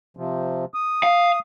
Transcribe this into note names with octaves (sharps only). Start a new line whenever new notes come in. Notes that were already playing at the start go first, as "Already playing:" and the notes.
C3 F3
D#6
F5